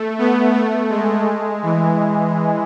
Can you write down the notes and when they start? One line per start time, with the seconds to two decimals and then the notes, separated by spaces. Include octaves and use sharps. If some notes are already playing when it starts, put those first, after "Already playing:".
Already playing: A3
0.18 B3
0.54 A3
0.90 G#3
1.62 E3